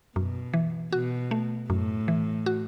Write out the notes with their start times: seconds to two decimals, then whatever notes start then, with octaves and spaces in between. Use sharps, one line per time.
0.15 F#2 B2
0.53 E3
0.92 B2 F#4
1.31 A3
1.70 F#2 A2
2.08 E3
2.46 F#4